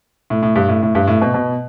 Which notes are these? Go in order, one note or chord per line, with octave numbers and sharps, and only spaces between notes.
A2
A2
G2
A2
A2
G2
A2
B2
B2